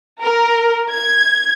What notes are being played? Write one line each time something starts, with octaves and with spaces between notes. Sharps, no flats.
A#4
G#6